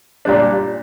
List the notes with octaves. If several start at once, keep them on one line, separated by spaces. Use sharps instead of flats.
A#2 G3 D4